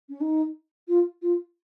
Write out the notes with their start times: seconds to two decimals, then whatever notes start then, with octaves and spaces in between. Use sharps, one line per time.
0.09 C#4
0.20 D#4
0.88 F4
1.22 F4